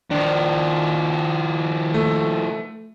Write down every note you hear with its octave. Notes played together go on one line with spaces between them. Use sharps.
D#3 F3 D4
A3